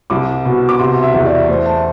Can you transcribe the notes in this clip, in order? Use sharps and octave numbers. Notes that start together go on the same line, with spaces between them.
C2 D6
B2
D6
C3 C6
E5
E2
D5
A3 C5
A5